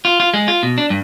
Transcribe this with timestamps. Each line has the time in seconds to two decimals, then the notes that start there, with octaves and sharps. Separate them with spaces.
0.05 F4
0.20 F4
0.34 G#3
0.48 F4
0.63 B2
0.78 D4
0.90 G2